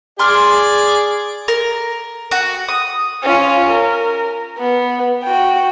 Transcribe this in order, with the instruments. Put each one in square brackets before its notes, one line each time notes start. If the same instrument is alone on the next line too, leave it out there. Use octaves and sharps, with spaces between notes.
[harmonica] G#4 D5 [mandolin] C6 D6 F6
[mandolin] A#4
F#4
D#6
[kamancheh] C#4 F4
A#4
B3
F#4 G5